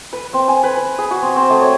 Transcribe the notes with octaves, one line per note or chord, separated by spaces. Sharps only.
B4
C4
G#5
B4
B4
G#4
F#4
C4
C4
A3
C#5